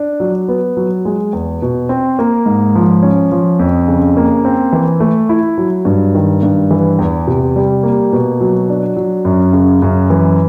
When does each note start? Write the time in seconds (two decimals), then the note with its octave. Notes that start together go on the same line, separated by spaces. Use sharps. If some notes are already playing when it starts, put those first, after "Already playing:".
Already playing: D4
0.20 F#3
0.48 B3
0.77 F#3
1.05 G#3
1.33 E2
1.62 B2
1.89 C4
2.19 A#3
2.46 G#2
2.75 F3
3.02 C#4
3.32 F3
3.59 F2
3.88 C#3
4.17 A#3
4.45 C4
4.73 E3
5.00 A3
5.29 E4
5.58 F#3
5.85 G2
6.15 D#3
6.43 G2
6.71 E3
6.99 E2
7.27 C3
7.56 G3
7.83 A#3
8.13 B2
8.41 F#3
8.69 D4
8.96 F#3
9.25 F#2
9.53 C#3
9.82 F#2
10.10 E3